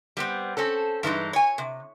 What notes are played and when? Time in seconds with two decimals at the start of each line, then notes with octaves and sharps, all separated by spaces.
0.17 G3 B3 C4
0.57 C4 C#4 A4
1.03 G2 E3 G#3 D#4
1.33 C#5 G#5
1.58 C3